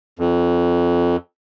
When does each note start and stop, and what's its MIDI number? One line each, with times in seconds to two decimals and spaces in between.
0.19 1.16 41